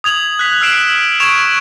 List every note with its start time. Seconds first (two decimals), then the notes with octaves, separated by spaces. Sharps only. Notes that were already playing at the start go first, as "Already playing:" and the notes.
0.04 D#6 G#6 F7 F#7
0.39 F#6 B6
0.61 E6 F6 C7 D7 E7
1.20 C#6 G#6 D7 E7 F7